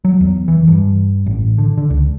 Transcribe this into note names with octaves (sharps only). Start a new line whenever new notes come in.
F#3
E2
E3
G2
A1
D3
D3
C#2